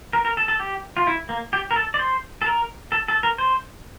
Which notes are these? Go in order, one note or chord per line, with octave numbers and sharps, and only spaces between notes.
A#4
A#4
A4
A4
G4
F4
E4
A#3
G4
A#4
A4
D5
C5
A4
A#4
A4
A4
A#4
C5